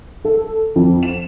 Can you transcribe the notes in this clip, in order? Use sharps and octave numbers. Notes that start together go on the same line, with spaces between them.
A4
F2
E7